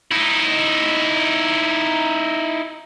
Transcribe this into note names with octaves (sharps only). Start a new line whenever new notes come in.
D#4 E4